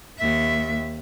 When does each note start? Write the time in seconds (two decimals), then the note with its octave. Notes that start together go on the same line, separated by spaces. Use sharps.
0.18 D#2 E5